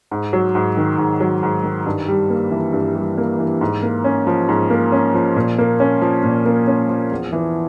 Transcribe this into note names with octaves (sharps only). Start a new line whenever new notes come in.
G#2
F#3
G#2
D#3
G#2
F#3
G#2
D#3
G2
G3
A#3
E3
G2
G3
A#3
E3
G#2
A#3
C#4
F3
G#2
A#3
C#4
F3
A#2
A#3
C#4
F3
A#2
A#3
C#4
F3
E2
E3